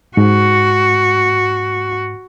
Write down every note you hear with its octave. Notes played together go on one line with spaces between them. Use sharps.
G#2 F#4